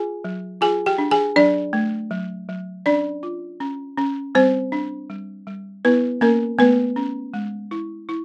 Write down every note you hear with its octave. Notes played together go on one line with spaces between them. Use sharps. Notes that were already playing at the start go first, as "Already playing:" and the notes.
Already playing: F4 G#4 G#5
F#3
F4 G#4 G#5
G4 G5
D4
G#4 G#5
F#3 D4 D5
A3
F#3
F#3
C#4 D4 D5
F4
C#4
C#4
G3 C4 C5
D4
G3
G3
B3 E4 B4
A#3 C#4 A#4
A3 B3 B4
C#4
G#3
E4
E4